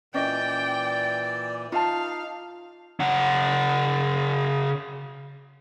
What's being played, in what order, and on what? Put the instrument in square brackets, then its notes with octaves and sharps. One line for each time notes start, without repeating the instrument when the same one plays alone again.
[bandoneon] A#2 E3 [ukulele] C#4 D#5 [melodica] D5 [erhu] G5
[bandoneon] D#4 [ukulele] F4 A5 [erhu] F5
[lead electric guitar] C#3 F#5